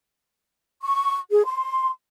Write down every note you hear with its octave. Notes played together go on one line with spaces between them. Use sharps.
C#6
G#4
C6